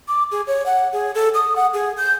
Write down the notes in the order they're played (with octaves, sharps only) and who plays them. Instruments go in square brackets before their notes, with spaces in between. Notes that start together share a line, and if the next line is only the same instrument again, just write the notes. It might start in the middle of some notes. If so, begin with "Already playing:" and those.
[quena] D6
G#4
C#5
F#5
G#4
A4
D#6
F#5
G#4
G6